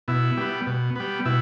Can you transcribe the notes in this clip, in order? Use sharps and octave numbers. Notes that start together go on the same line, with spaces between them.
B2 E4
G3 B3
B2
G3 B3
B2 E4